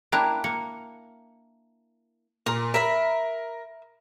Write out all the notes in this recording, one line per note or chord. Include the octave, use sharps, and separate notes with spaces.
A#3 D4 E4 G5 A#5 F#6
A#3 C#7
A#2 A#4 A#5
A#4 E5 B5